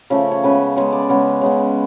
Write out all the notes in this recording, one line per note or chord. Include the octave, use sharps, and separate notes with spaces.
C#3 F3 A3 C#5
C#5
C#3 G#3 B3 B4
C#3 G#3 B3 C#5
D5
C#3 G#3 B3 C#5
C#3 G#3 B3